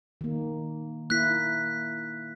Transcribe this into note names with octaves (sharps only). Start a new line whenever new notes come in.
D#3 A#3
A#3 E4 F#6 B6